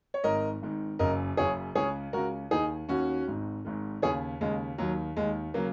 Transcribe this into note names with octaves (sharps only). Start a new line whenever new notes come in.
C#5
G#1 G#2 D#3 A#4 D#5
G#1 G#2 D#3
F#1 F#2 C#3 A#4 D#5
F#1 F#2 C#3 G#4 C#5
C#2 C#3 G#4 C#5
C#2 C#3 F#4 A#4
D#2 D#3 D#4 G#4
D#2 D#3 C#4 F#4
G#1 G#2 D#3
G#1 G#2 D#3
D#2 C#3 G#4 C#5
D#2 C#3 G#3
D#2 D#3 F#3
D#2 D#3 G#3
C#3 F#3 A#3